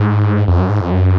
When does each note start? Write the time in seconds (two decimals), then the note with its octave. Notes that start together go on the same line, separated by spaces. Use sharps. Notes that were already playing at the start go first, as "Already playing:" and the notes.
Already playing: G#2
0.48 F2
0.59 F#2
0.69 G#2
0.81 F2
0.91 F#2